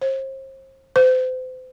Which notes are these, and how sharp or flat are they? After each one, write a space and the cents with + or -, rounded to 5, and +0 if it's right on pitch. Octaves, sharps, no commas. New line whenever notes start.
C5 +35
C5 -35